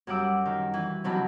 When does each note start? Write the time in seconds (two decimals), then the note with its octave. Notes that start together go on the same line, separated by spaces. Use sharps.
0.07 F#2 F#3 G3 F#5 D6 E6
0.46 D#3
0.74 E3
1.04 C3 D#3 F#3 E4 A5 B5